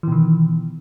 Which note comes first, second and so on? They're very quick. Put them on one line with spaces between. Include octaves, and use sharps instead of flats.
E3 B2 D#3